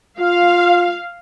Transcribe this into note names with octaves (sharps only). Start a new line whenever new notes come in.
F4 F5